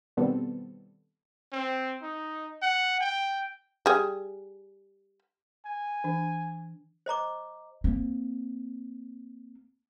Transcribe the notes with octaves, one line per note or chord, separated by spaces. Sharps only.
B2 D#3 G3 B3 C4 A4
C4
D#4
F#5
G5
G3 G#4
G#5
E3 D4
C5 D#5 A#5 D6
A#3 C4